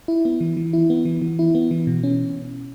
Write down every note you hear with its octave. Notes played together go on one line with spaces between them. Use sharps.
E4
B3
E3
E3
E4
B3
E3
E3
E4
B3
E3
B2
C#4